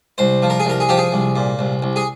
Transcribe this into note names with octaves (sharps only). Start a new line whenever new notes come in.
C2 C5
F3
A#4
G#4
C2 A#4
G#4
F3 G4
G#4
C2
A#2
C2
C2
G#4